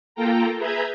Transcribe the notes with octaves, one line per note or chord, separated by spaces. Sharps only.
A#3 F4 A4 G5 A#5
G#4 B4 E5 A#5 G6 G#6